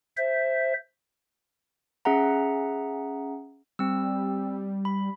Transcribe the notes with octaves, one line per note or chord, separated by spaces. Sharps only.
C5 E5
C#4 G#4 E5 F#5 A#5
G3 C4 E6
B5